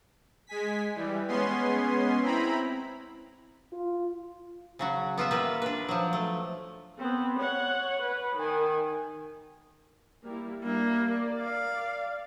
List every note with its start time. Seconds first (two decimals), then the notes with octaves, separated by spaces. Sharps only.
0.47 G#3 G#5 B6
0.95 E3 G3
1.28 G#3 B3 C#4 G#5 C6
2.22 C4 E4 A#5 B5
3.72 F4
4.79 C#3 F#3 F#4
5.18 B3 F4 F#4 E5
5.31 G3 A#3 F4 B4 E5
5.62 D4 B4
5.89 F3 F#3
6.13 A3
6.98 B3 C4
7.39 C#5 F#5
8.02 B4
8.36 D#3 G#5
10.24 G3 A#3 E4
10.64 G3 A#3 D4 E5
11.04 A#4 D5
11.42 F5
11.73 D5